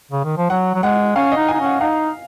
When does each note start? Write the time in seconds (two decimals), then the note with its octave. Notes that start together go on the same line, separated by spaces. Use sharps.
0.11 C#3
0.24 D#3
0.38 F3
0.50 F#3 F#5
0.75 F#3
0.83 G#3 F#5
1.16 C#4 F5
1.32 D#5
1.37 D#4
1.48 G#5
1.54 D#4
1.60 C#4 F#5
1.80 D#4 F5